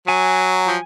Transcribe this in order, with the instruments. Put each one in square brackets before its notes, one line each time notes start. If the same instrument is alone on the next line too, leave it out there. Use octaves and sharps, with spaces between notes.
[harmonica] F#3 [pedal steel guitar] G#5
[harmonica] F3